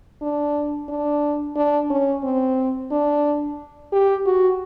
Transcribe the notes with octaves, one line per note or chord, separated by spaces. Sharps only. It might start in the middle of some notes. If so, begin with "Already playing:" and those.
D4
D4
D4
C#4
C4
D4
G4
F#4